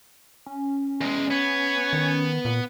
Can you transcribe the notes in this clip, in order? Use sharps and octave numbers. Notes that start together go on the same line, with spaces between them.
C#4
E2 G#3
B3 C#5
D#3
A#2